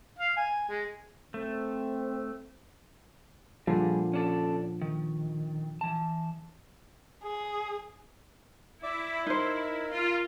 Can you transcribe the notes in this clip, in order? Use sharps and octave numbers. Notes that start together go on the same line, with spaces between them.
F5
G#5
G#3
A3 C4
A#2 D3 F3 G3 G#4
C#4 D4 A4
D#3
E3 A5
G#4
E4 D5 E5 D6
D#4 A#4 C5
F4